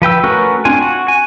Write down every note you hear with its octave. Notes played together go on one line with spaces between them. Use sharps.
F3 B4 G5 E6
A3 C#4 F#4 A#4 B4
C4 D4 F4 G#5
F#4
G#5